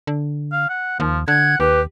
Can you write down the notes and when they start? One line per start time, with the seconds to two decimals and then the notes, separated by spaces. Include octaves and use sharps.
0.07 D3
0.52 F5
0.69 F#5
1.00 D#2 F3
1.28 D3 F#5 G#6
1.60 D#2 G4 B4